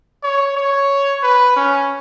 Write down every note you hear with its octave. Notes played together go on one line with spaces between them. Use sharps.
C#5
C#5
B4
C#4